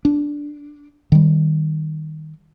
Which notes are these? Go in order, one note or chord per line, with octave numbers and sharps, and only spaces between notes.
D4
D#3 G3